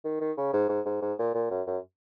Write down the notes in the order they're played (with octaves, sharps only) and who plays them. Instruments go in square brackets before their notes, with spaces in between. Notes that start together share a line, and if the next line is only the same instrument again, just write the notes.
[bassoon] D#3
D#3
C#3
G#2
G#2
G#2
G#2
A#2
A#2
F#2
F#2